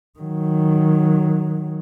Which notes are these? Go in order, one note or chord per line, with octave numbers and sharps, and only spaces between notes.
D#3 F#3